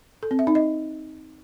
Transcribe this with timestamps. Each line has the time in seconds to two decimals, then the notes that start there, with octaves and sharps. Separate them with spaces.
0.23 A4
0.31 C4
0.39 E5
0.47 D#4
0.55 D#5